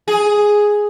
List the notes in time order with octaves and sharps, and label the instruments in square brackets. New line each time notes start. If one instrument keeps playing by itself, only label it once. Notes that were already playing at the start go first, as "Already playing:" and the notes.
[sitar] G#4